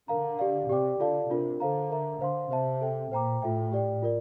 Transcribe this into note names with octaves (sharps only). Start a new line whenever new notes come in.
D3 A#4 F5 A#5
G4 D5 F5
C3 G4 D5 G5 D6
D3 F4 A4 D5 F5 A5
C3 D4 F4 A#4
D3 A4 C5 F5 A#5
A#4 E5 A#5
D3 C5 F5 C6
C3 C5 E5 A5
A4 E5 G5
A#2 C5 G5 A#5 D6
A2 F4 A4 E5 G5
G4 D5 G5
F4 A#4 D5